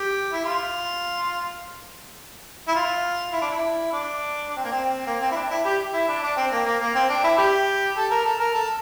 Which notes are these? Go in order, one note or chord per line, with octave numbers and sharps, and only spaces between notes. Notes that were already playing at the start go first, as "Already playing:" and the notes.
Already playing: G4
E4
F4
E4
F4
E4
D4
E4
D4
D4
C4
A#3
C4
A#3
C4
E4
D4
E4
G4
E4
D4
D4
C4
A#3
A#3
A#3
C4
D4
E4
G4
A4
A#4
A4
A#4
A4